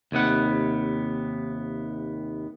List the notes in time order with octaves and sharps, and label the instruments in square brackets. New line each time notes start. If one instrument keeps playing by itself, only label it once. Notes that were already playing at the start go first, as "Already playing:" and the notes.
[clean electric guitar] D#2 C3 B3 F#5